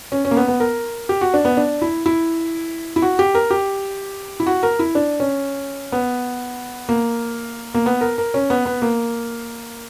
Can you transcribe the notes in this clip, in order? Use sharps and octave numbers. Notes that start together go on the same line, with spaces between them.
C#4
C#4
A#3
B3
B3
A#4
G4
F#4
D4
B3
D4
E4
E4
E4
F#4
G4
A#4
G4
E4
F#4
A#4
E4
D4
C#4
B3
A#3
A#3
B3
A#4
A#4
C#4
B3
B3
A#3